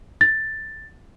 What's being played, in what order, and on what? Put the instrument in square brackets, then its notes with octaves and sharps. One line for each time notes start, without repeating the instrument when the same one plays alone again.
[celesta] A6